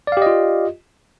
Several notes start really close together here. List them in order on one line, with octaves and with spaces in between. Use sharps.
D5 F5 G4 D#5 F4